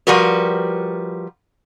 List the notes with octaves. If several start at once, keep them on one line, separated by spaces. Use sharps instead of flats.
F3 G3 F#4 A#4 B4